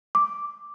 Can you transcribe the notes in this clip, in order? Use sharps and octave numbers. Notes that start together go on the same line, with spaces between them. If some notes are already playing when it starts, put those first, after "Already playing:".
D6